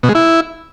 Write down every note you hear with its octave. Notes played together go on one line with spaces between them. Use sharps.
B2
G#3
E4